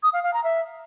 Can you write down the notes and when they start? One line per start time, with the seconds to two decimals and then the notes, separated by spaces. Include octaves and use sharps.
0.03 D#6
0.13 F5
0.23 F5
0.34 A#5
0.44 E5